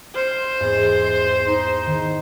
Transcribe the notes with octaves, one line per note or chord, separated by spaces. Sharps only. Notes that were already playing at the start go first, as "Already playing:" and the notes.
C5 F6 C#7
E2 G#2
D#4
D#3